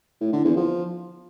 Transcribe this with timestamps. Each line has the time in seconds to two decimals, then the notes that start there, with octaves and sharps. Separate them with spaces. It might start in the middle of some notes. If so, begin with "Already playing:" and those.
0.21 A2
0.33 D3
0.44 E2
0.56 F3